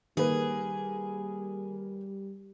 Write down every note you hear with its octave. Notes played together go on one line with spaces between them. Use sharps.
D#3 G3 A#3 G#4 B4